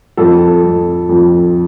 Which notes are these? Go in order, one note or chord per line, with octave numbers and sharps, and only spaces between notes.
F2 A4
F2
F2